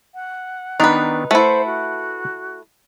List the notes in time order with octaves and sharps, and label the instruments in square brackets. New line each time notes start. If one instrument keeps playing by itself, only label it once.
[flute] F#5
[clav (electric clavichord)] D#3 B3 D4 [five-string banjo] D#4 B4
[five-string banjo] A3 E4 [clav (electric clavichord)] A4 B4 F#5 [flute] C5
[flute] F#4